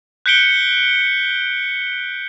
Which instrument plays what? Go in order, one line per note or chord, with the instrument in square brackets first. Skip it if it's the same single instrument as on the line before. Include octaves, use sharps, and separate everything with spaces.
[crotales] F#6 G6 B6 C#7 D7 G7